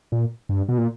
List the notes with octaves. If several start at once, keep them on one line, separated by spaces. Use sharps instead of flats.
A#2
G2
B2
A#2